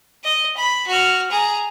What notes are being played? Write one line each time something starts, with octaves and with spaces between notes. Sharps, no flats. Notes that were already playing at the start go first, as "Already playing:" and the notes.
D#5
B5
F#4 F6
G#4 A#5